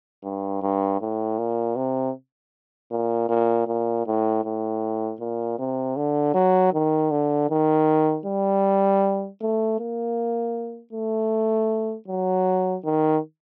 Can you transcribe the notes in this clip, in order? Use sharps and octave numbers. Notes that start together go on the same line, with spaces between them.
G2
G2
A2
A#2
C3
A#2
A#2
A#2
A2
A2
A#2
C3
D3
F#3
D#3
D3
D#3
G3
A3
A#3
A3
F#3
D#3